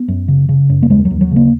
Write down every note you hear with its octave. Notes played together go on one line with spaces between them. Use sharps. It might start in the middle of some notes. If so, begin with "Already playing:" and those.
Already playing: B3
F#2
C#3
C#3
F#2
A#3
D#2 G#3
F#3
D#2
F#3
C#3 A#3